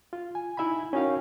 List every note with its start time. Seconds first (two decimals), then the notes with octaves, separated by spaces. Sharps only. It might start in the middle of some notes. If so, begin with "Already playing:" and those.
0.13 F4
0.35 G#5
0.57 D#4 E4 E5 G#5 B5
0.93 C#4 D#4 F#4 A#4 F5 G5